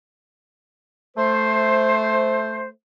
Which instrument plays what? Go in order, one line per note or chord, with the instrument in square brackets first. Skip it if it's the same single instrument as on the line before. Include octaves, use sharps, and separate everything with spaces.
[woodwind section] A3 C5